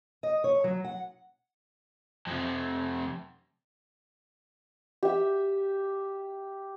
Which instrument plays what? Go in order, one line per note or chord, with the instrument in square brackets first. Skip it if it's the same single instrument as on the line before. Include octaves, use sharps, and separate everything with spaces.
[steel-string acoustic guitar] D#5
C#5
F#3
F#5
[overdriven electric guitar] F2 C3
[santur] G4 E5